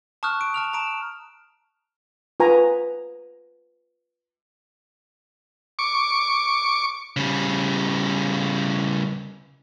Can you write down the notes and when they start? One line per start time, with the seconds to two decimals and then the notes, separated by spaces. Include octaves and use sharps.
0.23 A5 C#6 D#6 F6 F#6
0.41 D7
0.54 A5 F6 F7
0.73 A5 A#5 D7 E7
2.40 F4 B4 G#5 A#5
5.79 C#6 D6
7.17 C#3 G3